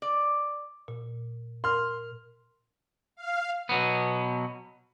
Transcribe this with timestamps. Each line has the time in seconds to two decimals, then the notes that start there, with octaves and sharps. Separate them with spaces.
0.02 D5
0.88 A#2
1.64 A#4 C6 F6
3.15 F5
3.69 B2 F#3 B3